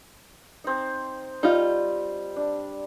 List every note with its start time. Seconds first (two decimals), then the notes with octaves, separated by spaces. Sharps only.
0.64 C4 D#4
1.43 G3 D#4 F4
2.36 D4